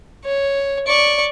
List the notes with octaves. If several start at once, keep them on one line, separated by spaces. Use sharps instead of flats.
C#5
D5 C#6